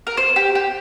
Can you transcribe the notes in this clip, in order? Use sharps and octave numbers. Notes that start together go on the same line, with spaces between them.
A#4
C5
G4
G4